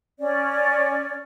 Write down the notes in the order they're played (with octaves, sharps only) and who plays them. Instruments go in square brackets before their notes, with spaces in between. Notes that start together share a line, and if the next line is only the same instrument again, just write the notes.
[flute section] C#4 D5